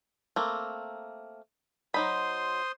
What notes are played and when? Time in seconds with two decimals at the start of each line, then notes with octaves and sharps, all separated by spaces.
0.36 A3 A#3 C4
1.94 F#3 D#4 C5 B5 C6 D#6